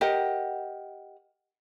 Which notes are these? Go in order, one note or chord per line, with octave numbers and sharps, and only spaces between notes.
G4 A#4 D#5 F#5